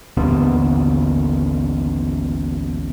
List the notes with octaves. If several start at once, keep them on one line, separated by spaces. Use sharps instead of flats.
A1 D#2 D3 B3